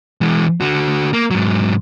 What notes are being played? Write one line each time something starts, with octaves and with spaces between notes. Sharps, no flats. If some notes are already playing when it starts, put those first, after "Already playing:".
E3 G#3
D3 F#4
A#3
G#2 F#3